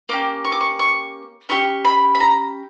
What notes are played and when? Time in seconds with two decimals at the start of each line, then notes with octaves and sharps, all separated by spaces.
0.09 A#3 C#4 G4 D6
0.44 C#6
0.52 D6
0.61 C#6
0.79 C#6
1.49 C#4 G4 C#6
1.85 B5
2.15 B5
2.20 A#5